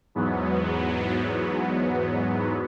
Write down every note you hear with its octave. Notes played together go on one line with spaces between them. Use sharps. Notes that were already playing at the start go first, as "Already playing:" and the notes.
E2 G#2 F#3 B3